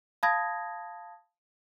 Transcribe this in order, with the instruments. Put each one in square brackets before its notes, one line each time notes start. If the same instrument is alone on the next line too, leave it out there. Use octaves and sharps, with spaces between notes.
[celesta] F5 A5 B5 D#6 G#6 A#6